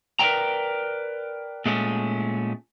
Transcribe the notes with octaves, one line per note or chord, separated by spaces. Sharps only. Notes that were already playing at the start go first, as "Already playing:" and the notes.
A#4 B4 C#5 D5 G5 A#5
A#2 G#3 A3 C#4